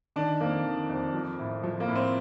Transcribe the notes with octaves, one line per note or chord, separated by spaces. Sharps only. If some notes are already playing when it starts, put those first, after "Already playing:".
D#3 D4
F2 A#3
D#3
F2
F3
A2
F3
A#3
A2
C4